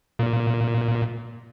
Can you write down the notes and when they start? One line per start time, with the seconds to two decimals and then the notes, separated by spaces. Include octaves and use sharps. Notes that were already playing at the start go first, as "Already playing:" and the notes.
0.19 A#2